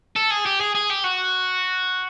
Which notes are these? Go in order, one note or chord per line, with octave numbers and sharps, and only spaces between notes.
A4
G#4
G4
G#4
G#4
G4
F#4